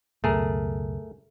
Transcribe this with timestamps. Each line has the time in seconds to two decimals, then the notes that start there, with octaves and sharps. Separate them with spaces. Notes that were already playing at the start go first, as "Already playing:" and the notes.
0.24 C#2 F#2 B2 A3 G#4 A#4